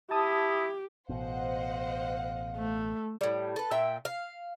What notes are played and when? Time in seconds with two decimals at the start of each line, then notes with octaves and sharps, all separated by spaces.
0.11 E4 G4 A5 D#6
1.09 A1 B2 C5 D#5 F5 F#5
2.56 A3
3.21 A2 G3
3.56 A4 B4
3.71 A#2 E5 G5
4.05 F5